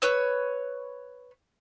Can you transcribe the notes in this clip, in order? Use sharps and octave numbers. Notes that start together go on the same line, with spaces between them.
B4 C#5 E6